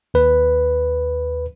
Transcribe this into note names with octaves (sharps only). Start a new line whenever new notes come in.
D#2 B4